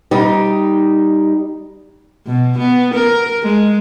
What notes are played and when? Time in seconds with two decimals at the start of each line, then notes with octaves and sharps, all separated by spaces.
0.11 G3 D#4
2.27 B2
2.59 B3
2.95 A#4
3.43 G#3